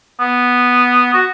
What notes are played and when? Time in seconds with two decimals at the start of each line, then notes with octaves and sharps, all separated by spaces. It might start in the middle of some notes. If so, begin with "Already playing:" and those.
0.20 B3
1.13 F#4